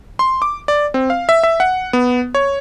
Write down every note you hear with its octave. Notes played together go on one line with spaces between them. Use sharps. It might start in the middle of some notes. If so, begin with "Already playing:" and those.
C6
D6
D5
C4
F5
E5
E5
F#5
B3
C#5